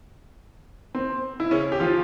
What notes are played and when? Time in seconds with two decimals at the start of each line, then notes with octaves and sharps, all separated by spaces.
0.95 C4
1.40 E4
1.51 C#3 C#4
1.72 G4
1.80 F3 F4